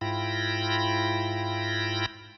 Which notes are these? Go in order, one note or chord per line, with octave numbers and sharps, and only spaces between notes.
G#2 E4 F4 G5 B5 A#6